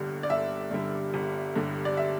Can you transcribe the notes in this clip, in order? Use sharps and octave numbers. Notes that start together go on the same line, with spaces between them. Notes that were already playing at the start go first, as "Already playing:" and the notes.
Already playing: G1 G2 D3 G3
D5
G1 E5
G2 D3 G3
G1
G2 D3 G3
D5
E5